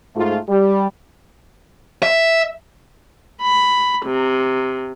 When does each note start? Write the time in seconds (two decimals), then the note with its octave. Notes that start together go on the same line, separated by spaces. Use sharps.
0.16 G#2 A3 F4
0.48 G3
2.03 E5
3.41 B5
4.06 C3